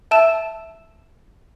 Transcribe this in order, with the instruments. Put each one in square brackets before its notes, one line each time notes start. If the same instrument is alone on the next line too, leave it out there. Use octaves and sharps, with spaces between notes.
[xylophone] E5 A5 E6 E7